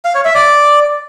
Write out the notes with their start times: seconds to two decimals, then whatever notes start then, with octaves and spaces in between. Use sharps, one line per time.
0.05 F5
0.15 C#5
0.25 E5
0.35 D5